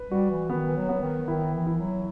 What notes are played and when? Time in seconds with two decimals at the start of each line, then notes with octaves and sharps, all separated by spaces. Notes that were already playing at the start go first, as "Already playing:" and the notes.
Already playing: B4
0.11 G3 F#4
0.30 E3
0.49 D#3 B3
0.66 E3
0.77 F#3
0.89 B3
1.01 D#3
1.28 D#3 E4
1.54 E3
1.66 E4
1.80 F#3